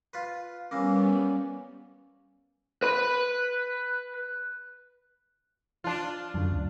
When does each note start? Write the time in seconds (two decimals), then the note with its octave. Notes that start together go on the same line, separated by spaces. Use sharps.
0.14 F4 B4
0.71 E3 G3 A#3 B3 C#4
2.83 B4 B5
5.84 D4 F4
6.34 F#2 D3
6.52 D2